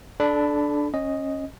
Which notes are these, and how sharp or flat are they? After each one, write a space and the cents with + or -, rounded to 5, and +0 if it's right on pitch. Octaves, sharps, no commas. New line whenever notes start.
D4 +0 A4 -25 B5 +15
C#4 -25 D#5 +0